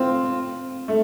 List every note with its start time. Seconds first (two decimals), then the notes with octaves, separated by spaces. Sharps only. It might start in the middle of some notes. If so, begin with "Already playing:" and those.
Already playing: C4 F4
0.88 A3